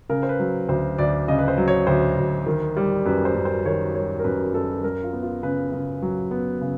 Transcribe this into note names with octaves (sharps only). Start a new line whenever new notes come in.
C#3 A#4
C5
B4
F#3
D2 C5
D2 D5
C#3 D#5
B4
C5
F#3
C#5
D2 C5
D2
D#3
G3
F#2 B4
C5
F#2
C5
D#3 C#5
G3 C#5
A#4
F#2 B4
F#2 A4
F#3 A#4
F4
B3
F4
C#3 B4
C#3
F#3
B3
C#3